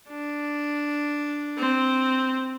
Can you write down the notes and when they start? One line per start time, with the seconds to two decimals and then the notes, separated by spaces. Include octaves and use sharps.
0.09 D4
1.58 C4